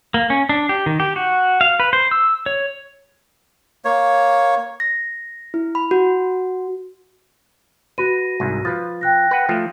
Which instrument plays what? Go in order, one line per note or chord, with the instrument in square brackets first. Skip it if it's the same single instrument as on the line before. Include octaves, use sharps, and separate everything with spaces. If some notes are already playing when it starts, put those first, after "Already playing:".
[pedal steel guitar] A#3
C#4
D4
G4
D#3
G4
F#4
F5
B4
C5
E6
C#5
[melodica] A#3 C#5
[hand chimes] A#6
E4
B5
F#4
[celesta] F#4 A#6 D#7 [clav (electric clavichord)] B4
[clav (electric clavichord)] C2 G#2
[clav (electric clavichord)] F3 B4 [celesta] A6
[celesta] G5 F#6 A#6
[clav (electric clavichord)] B4 F#5
F3 A3